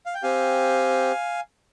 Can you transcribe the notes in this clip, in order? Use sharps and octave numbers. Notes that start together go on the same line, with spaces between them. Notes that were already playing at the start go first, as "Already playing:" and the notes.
F5
G5
C4 G4 F5 G#5